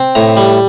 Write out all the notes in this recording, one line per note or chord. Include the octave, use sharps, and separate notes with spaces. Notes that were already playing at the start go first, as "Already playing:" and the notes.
Already playing: C4
A2 A#5
G3